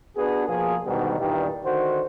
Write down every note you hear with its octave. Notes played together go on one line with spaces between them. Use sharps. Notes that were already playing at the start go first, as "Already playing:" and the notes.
B3 D4 F#4 G#4
B2 F3 A#3 G#4
G#2 B2 D3 D#3 G3
E2 G2 A#2 D#3 G3
D3 D#3 F#4 C5